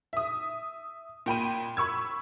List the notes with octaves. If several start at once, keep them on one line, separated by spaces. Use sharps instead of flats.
E5 D#6
A#2 G5 B5 D#7
B5 C#6 E6 G#6